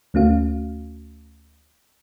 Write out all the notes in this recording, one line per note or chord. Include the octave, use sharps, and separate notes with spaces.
D2 A3 C#4 F#4 F5